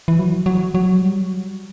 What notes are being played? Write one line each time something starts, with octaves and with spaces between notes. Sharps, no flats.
E3
F#3
F#3
F#3
G3